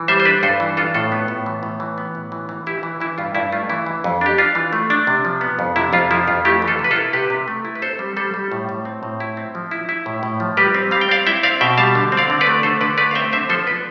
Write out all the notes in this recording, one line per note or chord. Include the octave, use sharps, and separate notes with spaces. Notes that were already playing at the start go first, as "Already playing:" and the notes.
Already playing: E3
G3 C5 E5
C5
D4 B4 D5
G2 A4 C5
E3
D4 F4 A4
A2 F4 A4
B3
A2
E3
A2
E3
B3
A2
E3
E3
E3 E4 G4
E3
E3 E4
G2 F4
G2 E4
A3 F4
E3 E4
E3
F2
D4 G4
D4 F4
E3
A3
D4
C3
F3
B3
F2
C3 E4
F2 F4
F3 E4
F2 F4
A3 E4 G4
E3
F4 A4
C3
B4
F4 A4
E4
C3 G4 B4
C3
A3
E4
B4
C4 A4 C5
G3
G3 A4 C5
G3
A2
A2
C4
A2
E4
C4
F3
E4
E4
A2
A2
F3
G3 G4 B4
C4
G3 F5
G5
C4 D5 F5
E4 E5 G5
C4 D5 F5
B2 E5 G5
G3 F5 A5
D3
C4
D5 F5
D3
B4 D5
A3
D3 A4 C5
D3 B4 D5
A3 B4 D5
F5
C4 E5 G5
D3 C5 E5
F3 A4 C5
B3 B4 D5